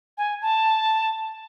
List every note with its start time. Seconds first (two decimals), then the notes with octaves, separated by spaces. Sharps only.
0.18 G#5
0.42 A5